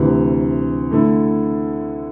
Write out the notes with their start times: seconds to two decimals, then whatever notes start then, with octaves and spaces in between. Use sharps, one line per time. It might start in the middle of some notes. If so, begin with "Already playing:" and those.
Already playing: D2 C3 E3
0.91 D3 A3 E4